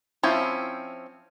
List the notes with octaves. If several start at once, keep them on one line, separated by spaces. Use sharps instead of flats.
F3 C4 C#4 E4